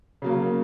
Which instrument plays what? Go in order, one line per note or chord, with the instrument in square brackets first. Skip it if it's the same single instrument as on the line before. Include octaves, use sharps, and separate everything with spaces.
[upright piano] C#3 F#3 A#3